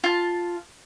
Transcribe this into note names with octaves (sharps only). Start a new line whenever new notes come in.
F4 A5